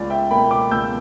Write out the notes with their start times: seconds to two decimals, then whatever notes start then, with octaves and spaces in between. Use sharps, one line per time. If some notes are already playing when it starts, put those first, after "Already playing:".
Already playing: C#2 D5
0.10 E5 G5
0.31 B2 A#3 G5 B5
0.51 B5 D6
0.71 C#2 E6 G6